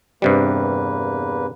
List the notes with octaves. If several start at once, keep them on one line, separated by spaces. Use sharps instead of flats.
E2 G2 C3 G3 A#3 B4